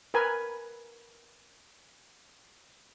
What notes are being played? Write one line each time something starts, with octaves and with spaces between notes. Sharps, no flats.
A#4 B4 G#5